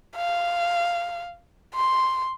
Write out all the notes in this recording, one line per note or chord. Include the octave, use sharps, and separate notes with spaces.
F5
C6